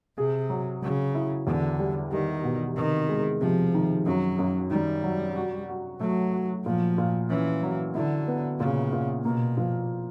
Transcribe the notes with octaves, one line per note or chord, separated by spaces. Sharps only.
C3 G#4
F#3
C#3 F#3
E4
E2 D3
G3
D#3 G3
B2
C3 D#3
G#3
C3 F3
D#3
F#2 F#3
F#2
D#3 G3
F#3
F#4
F#4
F#3 A3
F#4
A#2 F3
A#2
E3 C#4
F#3
D3 E4
B3
A#2 C#3
A#2
B2 A#3
F3